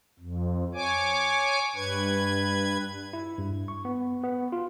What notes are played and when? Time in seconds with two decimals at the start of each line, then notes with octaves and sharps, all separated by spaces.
0.19 F2
0.74 C#5 G#5 D6
1.76 G2 B4 G#6
3.13 E4
3.38 G2
3.68 C#6
3.85 B3
4.23 B3
4.52 F4